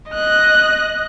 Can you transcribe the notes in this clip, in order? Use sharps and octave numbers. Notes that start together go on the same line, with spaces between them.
D#5 F#6